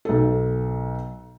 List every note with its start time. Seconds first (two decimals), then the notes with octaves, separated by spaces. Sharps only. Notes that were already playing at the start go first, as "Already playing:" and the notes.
0.05 B1 A4